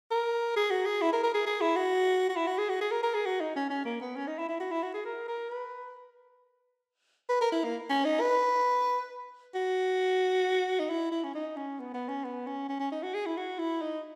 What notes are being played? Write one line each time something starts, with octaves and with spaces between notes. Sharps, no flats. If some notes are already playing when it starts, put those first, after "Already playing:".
A#4
G#4
F#4
G#4
E4
A#4
A#4
G#4
G#4
E4
F#4
F#4
E4
F#4
G#4
F#4
G#4
A#4
A#4
G#4
F#4
D#4
C#4
C#4
A#3
B3
C#4
D#4
E4
E4
F#4
E4
F#4
G#4
A#4
A#4
B4
B4
A#4
E4
A#3
C#4
D#4
B4
F#4
D#4
E4
E4
C#4
D#4
C#4
B3
B3
C#4
B3
C#4
C#4
C#4
D#4
F#4
G#4
E4
F#4
E4
D#4